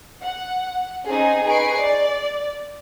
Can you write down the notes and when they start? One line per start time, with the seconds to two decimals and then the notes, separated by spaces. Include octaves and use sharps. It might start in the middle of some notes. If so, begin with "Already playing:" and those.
0.21 F#5
1.07 C4 C#4 D#4 G#4
1.46 D#4 G#4 B4 C#6 C7 D7
1.81 D5